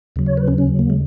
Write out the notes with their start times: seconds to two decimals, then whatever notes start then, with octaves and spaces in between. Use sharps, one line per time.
0.16 D#2 C#3 F#3
0.26 C#5
0.37 B4
0.47 C#4
0.58 C#4
0.79 A#3
0.90 G#3